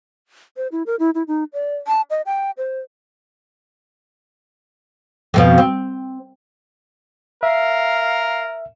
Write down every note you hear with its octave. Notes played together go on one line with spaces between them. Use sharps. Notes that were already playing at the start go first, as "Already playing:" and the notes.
C5
E4
A#4
E4
E4
D#4
D5
A5
D#5
G5
C5
F2 B2 F3
C4
A#4 E5 F5